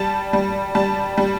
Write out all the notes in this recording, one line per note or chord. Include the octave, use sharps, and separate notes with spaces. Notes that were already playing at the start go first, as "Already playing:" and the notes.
Already playing: G3 A5
G3
G3 A5
G3